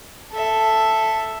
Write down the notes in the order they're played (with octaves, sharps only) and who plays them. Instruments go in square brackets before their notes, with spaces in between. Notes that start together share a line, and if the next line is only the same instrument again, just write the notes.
[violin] A4 E5